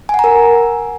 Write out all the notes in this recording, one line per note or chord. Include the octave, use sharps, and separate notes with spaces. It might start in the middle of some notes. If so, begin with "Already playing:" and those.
A#4 F#5 G#5 A#5